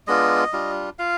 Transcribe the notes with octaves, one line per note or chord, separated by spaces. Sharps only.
G#3 B3 D4 F4 D#5
G3 D4 F4
F4 F5